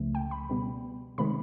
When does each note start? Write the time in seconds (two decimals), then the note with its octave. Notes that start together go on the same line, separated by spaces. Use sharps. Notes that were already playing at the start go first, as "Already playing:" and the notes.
Already playing: C#2 C#3 F3 A3
0.15 G5
0.31 B5
0.49 B2 G3 B3
1.18 C3 D#3 G#3 B5